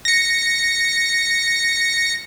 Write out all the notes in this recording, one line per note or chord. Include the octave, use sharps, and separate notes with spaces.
A#6 C#7